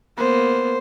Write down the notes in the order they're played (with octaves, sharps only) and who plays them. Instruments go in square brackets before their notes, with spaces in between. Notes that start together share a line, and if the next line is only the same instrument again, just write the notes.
[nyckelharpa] A#3 B3 [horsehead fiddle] C5